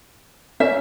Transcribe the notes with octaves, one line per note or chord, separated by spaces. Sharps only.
C#4 E5